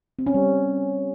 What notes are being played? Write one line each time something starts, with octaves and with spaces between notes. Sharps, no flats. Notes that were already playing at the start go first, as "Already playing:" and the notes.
C4
C#4
G3